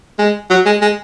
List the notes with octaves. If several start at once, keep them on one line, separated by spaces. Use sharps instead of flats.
G#3
F#3
G#3
G#3